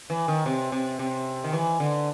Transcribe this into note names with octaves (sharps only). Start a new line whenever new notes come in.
E3
D#3
C3
C3
C3
D#3
E3
D3